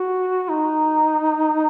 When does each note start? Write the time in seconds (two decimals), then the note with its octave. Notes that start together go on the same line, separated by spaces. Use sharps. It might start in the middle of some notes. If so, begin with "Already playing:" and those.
Already playing: F#4
0.50 D#4